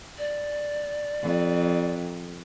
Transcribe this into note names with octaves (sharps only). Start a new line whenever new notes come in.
D5
F2